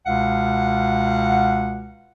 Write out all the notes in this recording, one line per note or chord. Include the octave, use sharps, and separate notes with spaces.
C#2 B2 F5 F#5